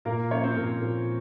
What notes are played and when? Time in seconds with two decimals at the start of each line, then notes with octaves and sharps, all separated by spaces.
0.05 A#2 A#3 A#4
0.31 F3 C#4 C#5
0.43 C4 C5
0.56 A#2 A#3 A#4
0.82 A#2